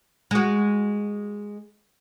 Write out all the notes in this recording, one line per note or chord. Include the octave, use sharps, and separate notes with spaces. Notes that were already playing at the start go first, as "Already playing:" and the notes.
G#3 F#4